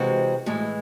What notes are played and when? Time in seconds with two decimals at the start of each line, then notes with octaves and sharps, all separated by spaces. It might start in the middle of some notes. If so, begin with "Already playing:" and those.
Already playing: C3 E3 G#3 C4 F#4
0.46 A2 E3 G#3